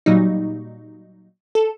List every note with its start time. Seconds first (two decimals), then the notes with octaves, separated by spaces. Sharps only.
0.06 A#2 F#3 G3 D#4
1.55 A4